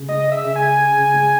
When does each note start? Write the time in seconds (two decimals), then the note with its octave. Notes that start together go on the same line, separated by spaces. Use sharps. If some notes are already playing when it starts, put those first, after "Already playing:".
Already playing: C#3
0.09 G#3 D#5
0.27 G#4
0.32 E5
0.44 C#3
0.56 G#5
0.61 G#4
0.79 G#4
0.97 C#3
1.14 G#3